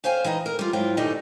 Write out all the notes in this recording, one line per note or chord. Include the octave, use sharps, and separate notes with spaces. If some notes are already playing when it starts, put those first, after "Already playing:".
C#4 C5 F5 G5 G#5
E3 D#4 D#5 A#5
A#4
G3 F4
G#2 F#3 E4 F4 G5
G2 D#3 E3 G3 A3 D#4